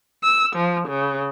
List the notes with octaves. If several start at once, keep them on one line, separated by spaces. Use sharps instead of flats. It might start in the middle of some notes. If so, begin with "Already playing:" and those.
E6
F3
C#3